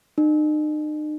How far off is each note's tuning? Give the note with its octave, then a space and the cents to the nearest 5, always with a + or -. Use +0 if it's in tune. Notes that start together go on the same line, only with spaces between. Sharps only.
D#4 -40